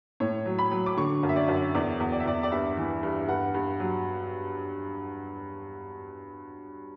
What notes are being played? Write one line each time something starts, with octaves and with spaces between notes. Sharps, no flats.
A2 C#5
F#3
B5
F#3
D6
D3 C#6
F#2
E5
D5
F#2
E2 D5
E2
D5
E5
E2 D5
D5
G2 E5
E3
G2
G2 F#5
G2
F#3